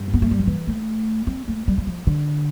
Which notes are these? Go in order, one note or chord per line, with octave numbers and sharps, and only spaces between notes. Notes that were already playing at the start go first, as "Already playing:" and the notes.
Already playing: G2
B3
A3
G3
F3
E3
A3
C4
A3
G3
G3
F3
D3